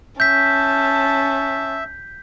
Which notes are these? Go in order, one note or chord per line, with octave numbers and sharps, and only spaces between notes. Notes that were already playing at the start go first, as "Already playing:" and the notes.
C#4 E5 A5 G6 B6